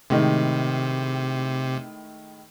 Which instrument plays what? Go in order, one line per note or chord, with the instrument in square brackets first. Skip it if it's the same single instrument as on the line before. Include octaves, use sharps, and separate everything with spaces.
[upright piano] A2 D#3 G#3 [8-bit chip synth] C3